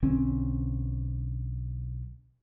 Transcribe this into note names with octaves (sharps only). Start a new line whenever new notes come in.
B1 D3 C4 C#4